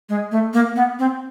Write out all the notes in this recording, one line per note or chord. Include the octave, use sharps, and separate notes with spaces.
G#3
A3
A#3
B3
C4